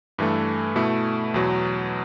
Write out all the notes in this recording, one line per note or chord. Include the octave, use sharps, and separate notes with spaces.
G2 E3 A3
B2 A3 E4
E2 B2 F#3